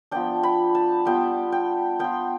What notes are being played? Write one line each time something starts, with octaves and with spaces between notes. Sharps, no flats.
F3 B3 D4 G5
B5
A5
G3 B3 F4 G5
G5
B3 F4 G5